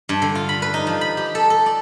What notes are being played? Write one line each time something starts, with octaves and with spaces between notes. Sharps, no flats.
G2
D3
F4
B5
B4
D#4
F3
B5
G4
A4
A4
D5